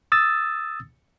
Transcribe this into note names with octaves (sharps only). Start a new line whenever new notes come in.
D#6 E6 A6